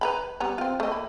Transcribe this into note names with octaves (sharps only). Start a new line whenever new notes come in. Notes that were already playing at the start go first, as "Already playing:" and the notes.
B4 A#5 B5
G3 B3 A#5
C4 F4
A3 D#5
A#3 B5